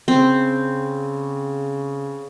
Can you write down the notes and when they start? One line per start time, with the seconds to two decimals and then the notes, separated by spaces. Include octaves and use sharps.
0.08 C#3 C4